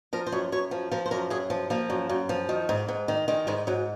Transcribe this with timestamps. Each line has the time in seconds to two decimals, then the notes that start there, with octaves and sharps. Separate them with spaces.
0.13 F3 A#4
0.26 C5
0.32 F#2 C#5
0.52 F#2 C#5
0.71 F3
0.92 F3 A#4
1.06 C5
1.11 F#2 A#4
1.30 F#2 G#4
1.50 F3
1.70 F3 A#3
1.90 F#2
2.09 F#2
2.29 F3
2.49 D#3
2.69 G#2
2.88 G#2
3.08 D#3
3.28 D#3 G#3
3.47 G#2 G#3
3.67 G#2 F#3